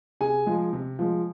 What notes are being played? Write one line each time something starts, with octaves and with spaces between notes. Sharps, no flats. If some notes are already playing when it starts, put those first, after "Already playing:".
C3 G#4 G#5
F3 G#3
C3
F3 G#3